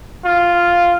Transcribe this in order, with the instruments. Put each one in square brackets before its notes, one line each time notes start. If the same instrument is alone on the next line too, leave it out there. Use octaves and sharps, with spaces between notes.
[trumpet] F4